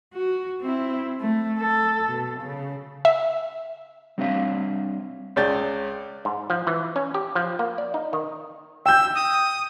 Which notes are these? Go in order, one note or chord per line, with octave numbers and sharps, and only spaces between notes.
F#4
C4 E4
A3
A4
B2
C#3
E5
G3 C4 D4 C#5 E5 F5
C#2 C#4 D5 G6 A6
G#2
F3
E3
C#4
G4
F3
A#3
D5
D#4
D#3
G5 E6 G6
D#6